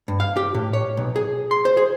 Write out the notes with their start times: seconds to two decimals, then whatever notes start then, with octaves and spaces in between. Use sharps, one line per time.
0.08 G2
0.20 F5
0.37 G4
0.54 A2
0.73 C#5
0.97 B1
1.16 G#4
1.51 C6
1.65 C5
1.77 G#4